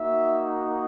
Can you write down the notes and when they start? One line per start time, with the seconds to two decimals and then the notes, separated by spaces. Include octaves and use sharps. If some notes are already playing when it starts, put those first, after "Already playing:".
Already playing: A#3 D#4 F#4 E5